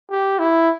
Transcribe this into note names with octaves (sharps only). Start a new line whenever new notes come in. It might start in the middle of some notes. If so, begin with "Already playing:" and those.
G4
E4